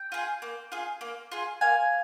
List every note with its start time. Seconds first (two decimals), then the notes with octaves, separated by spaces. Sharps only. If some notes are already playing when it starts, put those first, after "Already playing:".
Already playing: G5
0.12 F4 G#4
0.42 A#3
0.72 F4 G#4
1.01 A#3
1.32 F4 G#4
1.61 A#3 F5 G#5